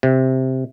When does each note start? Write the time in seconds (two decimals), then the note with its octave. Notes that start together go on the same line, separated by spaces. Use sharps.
0.03 C3